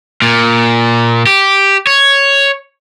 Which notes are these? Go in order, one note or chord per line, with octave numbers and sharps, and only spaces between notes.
A#2
G4
C#5